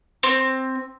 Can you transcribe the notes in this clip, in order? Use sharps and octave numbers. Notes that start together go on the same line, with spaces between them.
C4